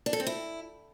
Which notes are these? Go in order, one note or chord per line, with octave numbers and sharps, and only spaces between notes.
D4
A4
C4
E4